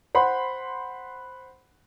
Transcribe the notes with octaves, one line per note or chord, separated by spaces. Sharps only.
C5 F#5 B5 C6